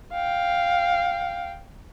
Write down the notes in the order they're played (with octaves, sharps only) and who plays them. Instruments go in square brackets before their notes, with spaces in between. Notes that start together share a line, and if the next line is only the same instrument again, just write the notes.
[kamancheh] F5 G5